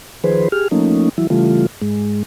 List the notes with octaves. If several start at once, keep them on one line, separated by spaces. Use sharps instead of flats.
D#3 F3 G#4 B4 C5
G4 G#4 F6
F3 A3 A#3 C#4 D#4
E3 F#3 E4
C#3 E3 G3 A3 F4
G#2 G#3